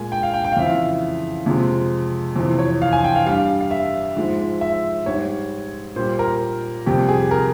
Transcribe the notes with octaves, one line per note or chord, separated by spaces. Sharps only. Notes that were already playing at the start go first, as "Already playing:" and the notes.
Already playing: A#2 G#3 G#5
G5
F5
G5
G5
F5
F2 C#3 E3 E5
F5
F2 C3 F3 G#3
F2 C3 E3
C#5
F5
G#5
G5
F5
G2 G3 F5
F5
E5
G#2 F3 G#3
E5
G#2 G3 C#5
A#2 G3 C5
A#4
F2 C3 G3 G4
G#4
A#4